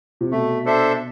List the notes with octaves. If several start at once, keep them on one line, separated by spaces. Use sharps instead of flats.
C3
B2 A3
D4 A4 C5 E5